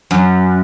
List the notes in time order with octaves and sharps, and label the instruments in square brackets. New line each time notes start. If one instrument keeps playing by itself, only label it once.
[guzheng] F#2